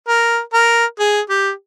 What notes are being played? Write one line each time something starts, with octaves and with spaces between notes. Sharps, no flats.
A#4
A#4
G#4
G4